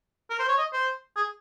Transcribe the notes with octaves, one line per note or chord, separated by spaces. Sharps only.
A#4
C5
C#5
D#5
C5
G#4